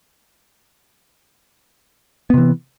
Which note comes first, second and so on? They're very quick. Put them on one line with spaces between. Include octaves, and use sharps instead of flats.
B3 C3 E3